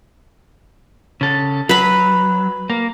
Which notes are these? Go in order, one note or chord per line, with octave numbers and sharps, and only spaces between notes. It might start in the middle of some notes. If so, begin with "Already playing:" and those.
C#3 A4
F#3 B4 B5
A#3